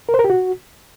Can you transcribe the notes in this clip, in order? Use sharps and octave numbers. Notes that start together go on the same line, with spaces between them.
A#4
C5
A#4
G4
F#4